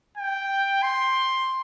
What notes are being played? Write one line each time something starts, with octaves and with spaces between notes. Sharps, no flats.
G5
C6